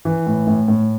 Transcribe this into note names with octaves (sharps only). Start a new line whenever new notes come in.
E3
A2
A2
A2